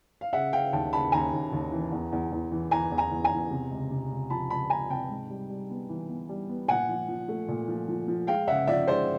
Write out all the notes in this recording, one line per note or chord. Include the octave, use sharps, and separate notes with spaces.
F5
C#3 E5 F#5
C#3 F5 G5
D#2 G5 A5
C#3 A5 B5
D#2 G#5 A#5
D#2
D#2
E3
E2
E2
E2
E3
E3 G#5 A#5
E2
G#5 A#5
E2
G#5 A#5
E2
C3
C#2
C3
C#2
F3 A5 B5
C#2 A5 B5
C#2 G#5 A#5
C3 G5 A5
G#2
G3
G3
B3
E3
B3
G3
B3
A#2 F#5 G#5
F3
F3
A3
A#2
F3
F3
F3
G#3 F5 G5
C#3 E5 F#5
F3 D5 E5
G#3 C5 D5